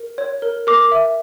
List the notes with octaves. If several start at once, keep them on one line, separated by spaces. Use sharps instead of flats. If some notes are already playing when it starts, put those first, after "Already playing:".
Already playing: A#4
C#5
A#4
A#4 D6
E5